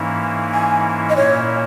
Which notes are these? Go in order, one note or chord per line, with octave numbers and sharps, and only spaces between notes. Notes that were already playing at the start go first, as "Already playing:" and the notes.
Already playing: G#2 E3 A#3 C#4 E4
G#5
D#5
A#2 A#3 C#4 E4 C#5